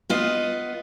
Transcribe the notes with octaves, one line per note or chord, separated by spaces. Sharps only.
B3 F4 D#5